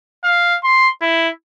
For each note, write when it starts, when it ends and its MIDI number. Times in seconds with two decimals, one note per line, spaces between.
0.24 0.58 77
0.64 0.89 84
1.01 1.29 64